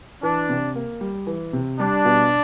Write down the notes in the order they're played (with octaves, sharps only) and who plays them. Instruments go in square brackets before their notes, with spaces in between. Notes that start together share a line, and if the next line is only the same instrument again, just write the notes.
[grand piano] E3 [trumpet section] D4
[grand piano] C3
A#3
G3
E3
C3
[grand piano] G3 [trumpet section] D4
[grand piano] B2